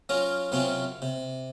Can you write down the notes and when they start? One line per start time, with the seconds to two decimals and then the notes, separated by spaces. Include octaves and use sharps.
0.09 F#3 C#4 F4 A#4
0.52 F#2 C3 F#3 C4 C#4 F4
1.02 C3